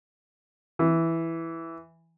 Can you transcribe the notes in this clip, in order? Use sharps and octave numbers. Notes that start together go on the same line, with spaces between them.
E3